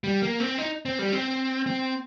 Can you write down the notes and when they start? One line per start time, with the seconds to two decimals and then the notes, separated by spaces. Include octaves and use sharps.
0.04 G3
0.22 A#3
0.40 C4
0.58 D#4
0.85 C4
0.99 G3
1.12 C4
1.67 C4